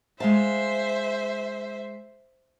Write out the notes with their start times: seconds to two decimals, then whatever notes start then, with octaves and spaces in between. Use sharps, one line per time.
0.20 G#3 C5 E5 F5 A5